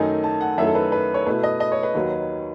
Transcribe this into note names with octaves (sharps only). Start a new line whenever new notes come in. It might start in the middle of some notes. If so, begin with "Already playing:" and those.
Already playing: F#2 D#3 A3 D#4 G#5
A5
F#5
F#2 D#3 A3 E4 E5
A4
B4
B4
C#5
B2 A3 E4 B4
D#5
D#5
C#5
B4
D#2 D#3 F#3